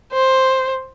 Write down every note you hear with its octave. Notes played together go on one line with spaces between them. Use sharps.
C5